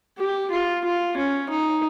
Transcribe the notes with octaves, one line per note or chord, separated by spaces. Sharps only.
G4
F4
F4
C#4
D#4